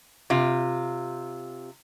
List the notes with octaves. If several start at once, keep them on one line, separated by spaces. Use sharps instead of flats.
C3 F4